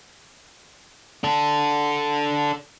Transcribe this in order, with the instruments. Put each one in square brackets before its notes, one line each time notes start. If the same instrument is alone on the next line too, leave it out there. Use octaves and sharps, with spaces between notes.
[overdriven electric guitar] D4 A4